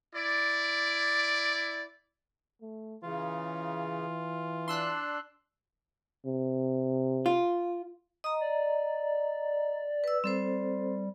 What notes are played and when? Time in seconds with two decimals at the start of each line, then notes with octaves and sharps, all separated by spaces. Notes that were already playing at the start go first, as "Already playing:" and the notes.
0.16 E4 D5
2.62 A3
3.03 C#3 E3 F4
4.68 D4 C6 E6 F#6
6.26 C3
7.26 F4
8.24 D#5 A#5 D#6
8.41 D5
10.04 B4 E6
10.24 G3 C4 A4 C5